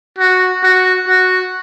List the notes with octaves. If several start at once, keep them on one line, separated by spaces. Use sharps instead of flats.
F#4
F#4
F#4